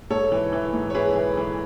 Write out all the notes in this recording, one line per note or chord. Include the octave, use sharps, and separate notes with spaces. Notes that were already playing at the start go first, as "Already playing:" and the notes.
G#2 A4 C#5
E3
E3
G#2
C#5
E3 G#4 B4
E3
E3